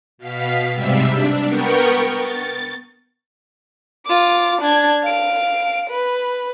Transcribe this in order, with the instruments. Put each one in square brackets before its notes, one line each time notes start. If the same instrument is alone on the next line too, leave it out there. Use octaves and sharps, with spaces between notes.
[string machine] B2 F5 B6
G#2 C3 G3 E5 B6
D4
B3 A#4 G5 C#6
A6
[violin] F4 D6
D4 G#6
F5 D7
B4